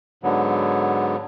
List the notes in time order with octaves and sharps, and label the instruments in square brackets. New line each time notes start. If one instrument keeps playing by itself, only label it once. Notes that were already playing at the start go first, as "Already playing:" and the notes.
[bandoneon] G#2 D3 F#3 B3